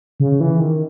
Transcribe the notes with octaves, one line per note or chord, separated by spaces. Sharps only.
C#3
E3
D#3